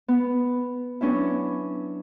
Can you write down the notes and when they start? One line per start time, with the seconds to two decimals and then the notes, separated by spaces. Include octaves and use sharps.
0.08 B3
1.01 F#3 B3 C#4 D4 E4